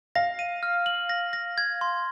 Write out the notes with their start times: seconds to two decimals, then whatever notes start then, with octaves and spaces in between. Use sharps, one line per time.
0.15 F5 A#6
0.39 D#7
0.63 F6
0.86 F#7
1.09 A#6
1.33 A#6
1.58 G#6
1.81 C6